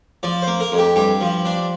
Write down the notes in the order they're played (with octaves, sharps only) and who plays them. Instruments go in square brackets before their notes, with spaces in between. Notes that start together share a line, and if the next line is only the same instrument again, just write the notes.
[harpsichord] F3 D5
C5
A#3
A#4
F2
G4
G2 G4
F3
D4